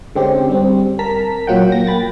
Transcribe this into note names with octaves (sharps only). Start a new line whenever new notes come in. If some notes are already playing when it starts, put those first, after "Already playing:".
D3 G#3 C4 C#4 G4
G3 C4
A#4 A5 A#5 B6
A#2 F#3 F4 F#5 G5
A#3 A#6
G5 B5 A6